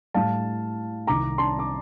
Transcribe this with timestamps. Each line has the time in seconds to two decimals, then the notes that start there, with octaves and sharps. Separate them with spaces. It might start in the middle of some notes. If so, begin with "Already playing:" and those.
0.14 A2 G3 F5 A5
1.07 C2 C3 D#3 A#5 D6
1.38 A5 C6
1.59 D6